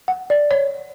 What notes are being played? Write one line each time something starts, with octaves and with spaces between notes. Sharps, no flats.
F#5
D5
C#5